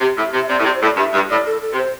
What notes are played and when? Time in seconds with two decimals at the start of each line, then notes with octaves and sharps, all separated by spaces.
0.01 C3 G4
0.17 A2 E5
0.34 C3
0.41 E5
0.49 C3 D5
0.59 A2
0.65 C3 D5
0.75 C5
0.82 A2 D5
0.97 G2 E5
1.14 G2
1.29 A2 D5
1.46 A4
1.62 A4
1.73 C3
1.78 C5